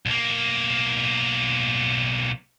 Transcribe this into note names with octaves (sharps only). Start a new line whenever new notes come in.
B1 A#3